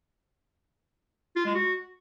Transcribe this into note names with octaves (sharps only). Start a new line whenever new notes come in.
F4
G#3
F#4